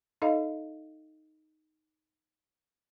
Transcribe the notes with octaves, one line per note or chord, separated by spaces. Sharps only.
D#4 A4 D#5 F5 A#5